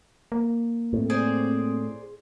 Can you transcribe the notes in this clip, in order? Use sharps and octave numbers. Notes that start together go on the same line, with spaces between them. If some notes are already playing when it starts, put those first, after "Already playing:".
A#3
A2 C4
G#4 C5 D5